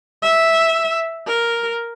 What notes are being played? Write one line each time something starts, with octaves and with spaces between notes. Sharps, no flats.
E5
A#4